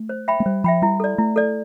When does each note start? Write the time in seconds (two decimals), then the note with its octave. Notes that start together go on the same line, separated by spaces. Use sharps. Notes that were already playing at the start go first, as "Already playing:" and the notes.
Already playing: A3
0.09 C5
0.28 E5 G5 B5
0.40 A3
0.46 G3 C5
0.64 F3 E5 G5 B5
0.82 G3 E4
1.00 A4 D5
1.18 A3 E4
1.36 A4 D5